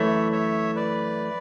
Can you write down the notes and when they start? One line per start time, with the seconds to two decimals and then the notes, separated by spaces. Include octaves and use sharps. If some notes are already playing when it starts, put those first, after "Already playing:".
Already playing: F#2 E3 A3 E4 C#5 E5
0.32 C#5 E5
0.76 B4 D5